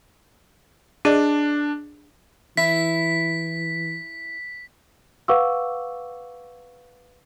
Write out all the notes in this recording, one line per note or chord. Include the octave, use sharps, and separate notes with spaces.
D4 G#4 D5 D#5
E3 E4 B6
B4 F5 F#5 C#6 D6 E6